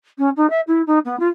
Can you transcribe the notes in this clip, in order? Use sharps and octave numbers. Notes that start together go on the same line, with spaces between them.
C#4
D#4
E5
E4
D#4
B3
F4